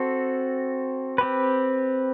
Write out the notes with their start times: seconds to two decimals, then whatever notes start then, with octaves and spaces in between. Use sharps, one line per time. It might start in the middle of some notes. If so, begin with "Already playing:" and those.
Already playing: C4 F#4 A4
1.18 C4 G4 B4